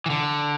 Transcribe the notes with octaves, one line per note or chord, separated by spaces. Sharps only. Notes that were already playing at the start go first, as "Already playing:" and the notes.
E3
D3